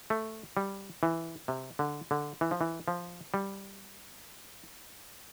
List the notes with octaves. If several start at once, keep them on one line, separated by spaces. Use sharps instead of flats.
A3
G3
E3
C3
D3
D3
E3
F3
E3
F3
G3